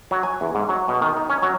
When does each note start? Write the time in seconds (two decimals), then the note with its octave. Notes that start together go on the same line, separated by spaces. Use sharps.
0.11 F#3
0.23 G#5
0.41 E2
0.55 G#2
0.69 F#3
0.88 B2
1.02 D#3
1.17 D#4
1.30 C#4
1.42 F#3